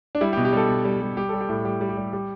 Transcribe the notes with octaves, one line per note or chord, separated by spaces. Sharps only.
D4
G3 E4
G4
B2
G4
G3 A4
B2
G3
G3
G3 G4
G3 A4
G4
A2
G3 G4
G3
G4
G3
G3